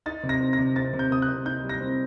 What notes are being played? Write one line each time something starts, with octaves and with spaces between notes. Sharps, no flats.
D#4 A6
C3
A#6
C4
A#6
C3
C4 A6
C3
G6
C3 D#6
F#6
C3
D#4 G6
G3
A#6
C4